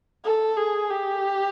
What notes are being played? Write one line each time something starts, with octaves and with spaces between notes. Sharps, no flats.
A4
G#4
G4